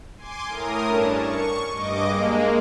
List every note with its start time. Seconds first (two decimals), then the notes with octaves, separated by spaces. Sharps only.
0.16 G#5 C6 D6
0.47 A2 A#4 D#6
0.86 G2 C#4 D4 A5
1.16 C#6
1.70 G2 D#5 D6
2.04 G#3 A#3